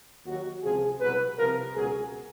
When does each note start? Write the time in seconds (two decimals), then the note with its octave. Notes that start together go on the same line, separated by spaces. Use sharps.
0.25 D#2 D#3 F#3 F#4
0.63 C#2 C3 F3 G#4
1.00 C2 B2 F#3 B4
1.38 C2 C3 F3 A#4
1.75 C#2 B2 F#3 G#4